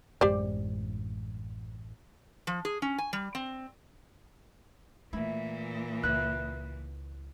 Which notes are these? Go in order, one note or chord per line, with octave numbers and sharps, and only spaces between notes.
A1 F#2 G#3 G4 C5 D5
F3
G#4
C#4
G#5
G3
C4
A#2 E3 A3 A#3 E4
C#2 E4 B4 F#6